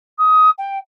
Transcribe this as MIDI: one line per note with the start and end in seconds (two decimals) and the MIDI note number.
0.18 0.50 87
0.58 0.78 79